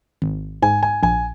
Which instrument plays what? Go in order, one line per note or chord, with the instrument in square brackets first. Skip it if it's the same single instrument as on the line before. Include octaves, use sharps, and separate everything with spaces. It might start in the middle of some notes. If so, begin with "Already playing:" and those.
[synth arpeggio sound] G#1
[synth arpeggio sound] G#2 [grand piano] G#5
[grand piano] G#5
[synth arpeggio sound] A#1 [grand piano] G#5